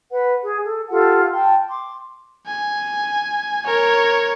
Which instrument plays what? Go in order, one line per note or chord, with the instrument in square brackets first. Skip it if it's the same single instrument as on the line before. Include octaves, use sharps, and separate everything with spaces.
[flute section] B4 F#5
G#4
A4
F4 G4 A4 F#5
G5 A5 C6
C6 D6
[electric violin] G#5
A#4 C#5